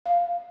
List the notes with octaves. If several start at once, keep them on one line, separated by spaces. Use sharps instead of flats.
F5